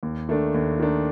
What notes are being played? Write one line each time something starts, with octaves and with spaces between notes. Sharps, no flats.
D#2
D#3 A3 D4
D#2
D#3 A3 D4